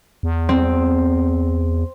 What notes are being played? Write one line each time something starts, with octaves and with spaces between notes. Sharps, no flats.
E2
C4